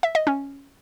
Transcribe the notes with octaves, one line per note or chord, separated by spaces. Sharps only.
E5
D#5
C#4